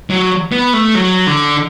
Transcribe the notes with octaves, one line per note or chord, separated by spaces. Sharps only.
F#3
B3
A3
F#3
D3